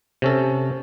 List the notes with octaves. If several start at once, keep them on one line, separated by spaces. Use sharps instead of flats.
C3 C#4 A4